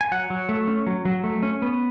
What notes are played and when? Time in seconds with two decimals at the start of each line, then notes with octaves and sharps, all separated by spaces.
0.01 G#5
0.12 F#3 F#5
0.30 F#3
0.49 A3
0.68 C#4
0.87 F#3
1.05 F#3
1.24 A3
1.43 C#4
1.62 B3